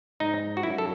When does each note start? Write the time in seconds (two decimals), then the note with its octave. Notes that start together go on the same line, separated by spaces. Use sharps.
0.20 G#2 D#4
0.57 F#4
0.63 F#2 E4
0.78 A4